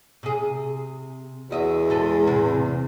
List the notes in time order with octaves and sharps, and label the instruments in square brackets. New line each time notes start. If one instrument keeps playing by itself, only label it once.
[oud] C3 G#4
[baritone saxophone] E2 [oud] F#4 D#5 E5
[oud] G#3 A4 B4
A2 C3